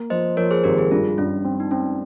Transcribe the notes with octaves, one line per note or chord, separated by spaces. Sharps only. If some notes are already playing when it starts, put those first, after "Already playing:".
Already playing: A#3
F3 C5 D#5
F3 A#4 C#5
G#4 C5
G#1 G4 A#4
G#4
G2 F4
G2 C#4
C4
D#4
C4 C#4